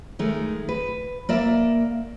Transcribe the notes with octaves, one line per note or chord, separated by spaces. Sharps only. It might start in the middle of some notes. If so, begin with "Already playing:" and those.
D#3 G#3 A3
B4
A#3 D5 E5